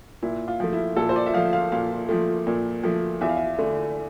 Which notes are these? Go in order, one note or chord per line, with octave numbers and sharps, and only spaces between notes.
A#2 E4
F4
F3 A3
E4
A#2 A4
C5
D5
E5
F3 A3 F5
F5
A#2 F5
F3 A3
A#2
F3 A3
E2 E5
F5
E5
D3 A3